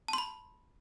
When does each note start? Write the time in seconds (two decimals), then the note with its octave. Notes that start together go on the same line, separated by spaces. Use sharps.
0.08 A5
0.13 C6
0.18 B5